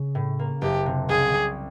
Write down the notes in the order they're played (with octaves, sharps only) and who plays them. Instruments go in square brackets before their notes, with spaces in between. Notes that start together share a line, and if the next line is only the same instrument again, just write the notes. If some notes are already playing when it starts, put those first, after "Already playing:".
Already playing: [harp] C#3
A2
A#3
[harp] F#1 [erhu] G4
[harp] C3
[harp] C2 [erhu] G#4
[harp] C3